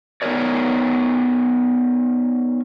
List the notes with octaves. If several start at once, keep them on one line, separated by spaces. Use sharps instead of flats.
B3 D#4 E4 A#4 C#5 D5